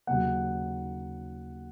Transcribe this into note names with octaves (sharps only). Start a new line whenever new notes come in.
D#2 C#3 F#3 F#5